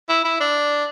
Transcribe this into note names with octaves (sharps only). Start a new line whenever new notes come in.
E4
E4
D4